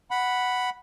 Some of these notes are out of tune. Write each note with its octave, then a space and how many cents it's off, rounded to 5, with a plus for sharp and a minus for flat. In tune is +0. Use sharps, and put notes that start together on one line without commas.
F#5 +0 B5 +0